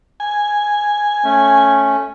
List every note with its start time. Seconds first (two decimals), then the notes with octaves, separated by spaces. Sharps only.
0.20 G#5
1.24 A3 C#4